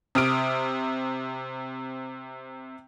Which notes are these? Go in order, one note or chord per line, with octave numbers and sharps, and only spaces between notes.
C3 D#6 F6 D7